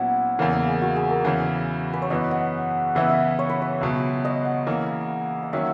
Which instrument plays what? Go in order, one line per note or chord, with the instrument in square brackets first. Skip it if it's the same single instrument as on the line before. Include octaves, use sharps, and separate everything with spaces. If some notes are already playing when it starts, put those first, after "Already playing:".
Already playing: [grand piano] A#2 F#3 C#4 E4 [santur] B3
[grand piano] E2 C#3 E3 [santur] A#3
[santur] A#3
G#4
F#4
G#4
A#4
[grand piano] E2 C#3 E3 [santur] B4
[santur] B4
C#5
[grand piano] F#2 E3 B3 [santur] D#5
[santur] F#5
[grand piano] C#3 E3 B3 E4 [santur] E5
[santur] E5
C#5
B4
C#5
[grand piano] C#2 B2 F#3
[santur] D#5
F#5
[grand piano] C#3 E3 A#3
[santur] F#5
[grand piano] D#3 F#3 A#3 C#4 [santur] E5